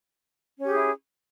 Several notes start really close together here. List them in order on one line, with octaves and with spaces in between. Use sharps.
C#4 G4 G#4 E4